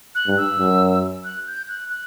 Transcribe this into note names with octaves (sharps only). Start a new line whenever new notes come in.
F#6
G2
E6
F#2
F#6
G6
F#6
F#6